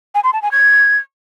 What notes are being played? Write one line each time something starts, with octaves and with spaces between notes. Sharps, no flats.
G#5
C6
A5
G#5
G#6